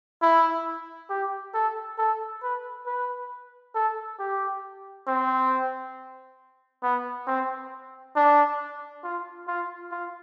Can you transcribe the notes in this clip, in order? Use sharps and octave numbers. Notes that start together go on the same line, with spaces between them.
E4
G4
A4
A4
B4
B4
A4
G4
C4
B3
C4
D4
F4
F4
F4